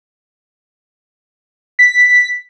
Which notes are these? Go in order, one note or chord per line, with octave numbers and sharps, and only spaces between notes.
B6